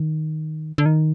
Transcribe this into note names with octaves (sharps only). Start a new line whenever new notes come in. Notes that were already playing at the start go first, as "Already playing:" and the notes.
Already playing: D#3
D3
D#3